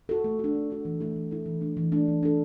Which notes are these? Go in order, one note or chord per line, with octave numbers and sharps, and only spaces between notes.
F#4 A4
A3
D4 F#4
A3
D4 F#4
E3
A3 E4 A4
E3
A3 E4 A4
E3
A3 D4
E3
A3 D4
E3
D4 A4